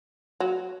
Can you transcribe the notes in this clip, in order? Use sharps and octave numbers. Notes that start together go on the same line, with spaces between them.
F#3